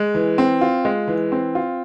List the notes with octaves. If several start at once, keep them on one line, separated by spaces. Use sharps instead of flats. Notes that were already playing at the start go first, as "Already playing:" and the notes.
Already playing: G#3
E3
C4
F4
G#3
E3
C4
F4